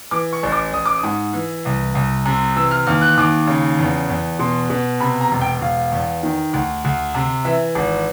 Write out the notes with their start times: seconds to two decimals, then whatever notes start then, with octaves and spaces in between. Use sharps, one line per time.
0.11 E3 D6
0.33 C#6
0.43 A1
0.52 D6
0.73 A1 D#6
0.85 D6
0.98 D#6
1.03 G#2
1.33 E3
1.65 C2
1.95 C2
2.26 C3
2.56 E3 E6
2.71 F6
2.87 D#2 F6
3.01 F#6
3.18 D#2 D6
3.47 C#3
3.79 E2
4.10 E2
4.39 B2 C6
4.70 B2
5.00 C3 B5
5.21 A#5
5.31 E1
5.41 G5
5.61 E1 F5
5.92 E2
6.23 D#3
6.53 D2
6.84 D2
7.14 C3
7.45 E3 E5
7.75 G#1